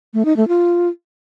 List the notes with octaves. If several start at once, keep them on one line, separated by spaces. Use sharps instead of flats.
A3
D#4
A3
F4